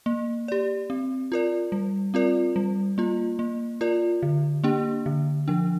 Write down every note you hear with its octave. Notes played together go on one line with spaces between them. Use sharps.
A#3
G4 D5
C4
F4 A#4 D5
G3
C4 F4 A#4 D5
G3
A#3 F4
A#3
F4 A#4 D5
D3
A#3 D4 G4
D3
F3 D4